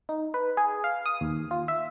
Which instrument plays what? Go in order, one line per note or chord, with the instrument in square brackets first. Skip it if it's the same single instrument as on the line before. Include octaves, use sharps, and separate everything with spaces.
[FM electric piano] D#4
B4
G#4
F5
D#6
D#2
F4
E5